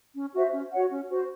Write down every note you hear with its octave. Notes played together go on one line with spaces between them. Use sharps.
C#4
F#4 C5 E5
C#4
F#4 C#5 F#5
C#4
F#4 C5